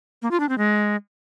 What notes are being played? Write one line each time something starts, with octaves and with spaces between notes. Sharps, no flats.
A#3
F4
D4
C4
G#3